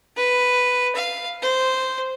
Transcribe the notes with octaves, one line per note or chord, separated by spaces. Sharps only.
B4
F5
C5